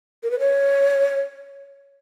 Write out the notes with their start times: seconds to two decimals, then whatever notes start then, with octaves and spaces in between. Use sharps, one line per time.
0.23 A#4
0.31 B4
0.40 C#5